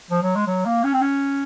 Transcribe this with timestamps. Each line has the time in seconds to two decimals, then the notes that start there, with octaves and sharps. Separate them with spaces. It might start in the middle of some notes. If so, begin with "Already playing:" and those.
0.11 F3
0.23 F#3
0.35 G#3
0.47 F#3
0.65 A#3
0.84 C#4
0.93 C4
1.02 C#4